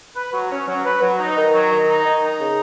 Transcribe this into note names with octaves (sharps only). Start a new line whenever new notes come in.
B4
F#3
C#4
F#3
B4
F#3
D#4
D#3
F#3
D#3
D#4
D#3
D#4
C#3